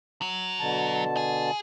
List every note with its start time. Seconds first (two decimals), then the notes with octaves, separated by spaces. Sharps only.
0.22 F#3
0.60 B2 D3 A5
1.17 G#4